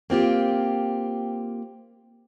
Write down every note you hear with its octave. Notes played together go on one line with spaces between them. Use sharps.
A#3 C4 F4 G4